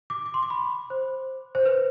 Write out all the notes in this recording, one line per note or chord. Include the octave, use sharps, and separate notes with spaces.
D6
D6
C6
D6
B5
C5
C5
B4